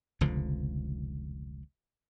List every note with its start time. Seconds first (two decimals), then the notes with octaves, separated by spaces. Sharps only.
0.21 F1 C#2 D3 F3